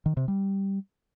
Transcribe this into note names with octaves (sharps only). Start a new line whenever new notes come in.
D#3
C3
G3